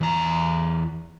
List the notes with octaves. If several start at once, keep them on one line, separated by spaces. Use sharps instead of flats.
E2 A#5